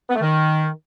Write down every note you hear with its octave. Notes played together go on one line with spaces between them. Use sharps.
B3
A3
D#3